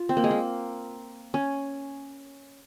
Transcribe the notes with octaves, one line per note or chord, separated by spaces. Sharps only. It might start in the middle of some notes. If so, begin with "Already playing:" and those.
Already playing: F4
C4
A#3
G#3
A#3
C#4